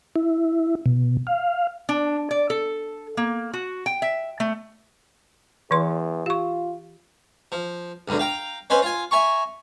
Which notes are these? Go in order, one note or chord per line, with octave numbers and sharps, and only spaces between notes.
E4
B2
F5
D4
D5
A4
A#3
F#4
G5
E5
A3
E2 E3 B4 C6
F4 G4 C#6
F3
C#2 F#2 B2 D3
F5 G5 A#5
B3 C#4 C5 D#5 G#5 B5
F4 G#5
E5 G#5 A#5 C#6